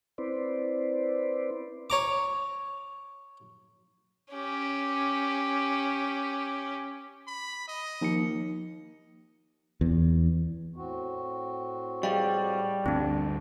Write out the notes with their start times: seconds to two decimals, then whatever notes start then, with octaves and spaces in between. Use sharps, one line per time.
0.18 C4 E4 B4 C5 D5
1.90 C#5 A#5 D6
4.32 C#4 G4
7.27 B5
7.68 D#5
8.01 D#2 F3 C#7
9.81 E2
10.76 A2 C4 F#4
12.03 G3 G#4 D#5 F5
12.86 D2 G2 C4 D4 A5